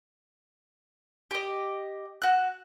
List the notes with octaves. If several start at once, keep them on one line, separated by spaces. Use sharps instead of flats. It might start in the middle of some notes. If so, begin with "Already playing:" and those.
G4 D#5
F#4 F#6